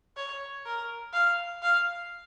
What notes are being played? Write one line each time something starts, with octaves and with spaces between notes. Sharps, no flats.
C#5
A#4
F5
F5